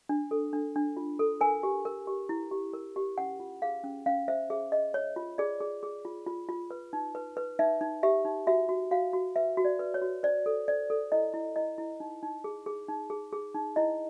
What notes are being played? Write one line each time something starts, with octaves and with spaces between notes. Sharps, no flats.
D4
A4
D4
D4
F4
A4
A#4 G#5
G4
A#4
G4
E4
G4
A#4
G4
C#4 F#5
F4
G#4 F5
C#4
C#4 F5
C5 E5
G#4 E5
G#4 D#5
C#5
F4
G#4 D5
G#4
G#4
F4
F4
F4
B4
D#4
B4
B4
D#4 E5
D#4
G4 E5
D#4
F#4 E5
F#4
F#4 F5
F#4
B4 E5
F#4
D5
B4
C#5
F#4
C5 D5
A4
C5 D5
A4
E4 D#5
E4
E4 D#5
E4
D#4
D#4
G#4
G#4
D#4
G#4
G#4
D#4
E4 D#5